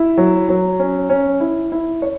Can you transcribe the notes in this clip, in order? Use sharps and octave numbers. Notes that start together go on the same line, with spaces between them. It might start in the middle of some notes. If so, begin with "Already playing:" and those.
Already playing: E4
F#3
F#3
C#4
C#4
E4
E4
C#5